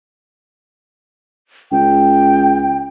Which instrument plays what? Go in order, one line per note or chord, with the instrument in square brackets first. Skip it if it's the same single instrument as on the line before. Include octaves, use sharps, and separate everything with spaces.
[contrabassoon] C#2 [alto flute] G5